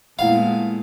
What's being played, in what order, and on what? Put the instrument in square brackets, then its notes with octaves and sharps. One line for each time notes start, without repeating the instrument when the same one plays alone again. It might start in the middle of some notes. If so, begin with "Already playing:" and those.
[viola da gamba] A#2 B3 [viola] G#3 A3 [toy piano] E4 F#5 B5 [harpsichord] F5